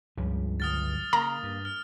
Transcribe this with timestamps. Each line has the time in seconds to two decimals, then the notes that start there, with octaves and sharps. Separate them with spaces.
0.17 C#2 G2 F3 G3
0.60 G1 F#3 D#6 F6 A6
1.13 C#3 A#3 A#5
1.43 G2
1.65 F6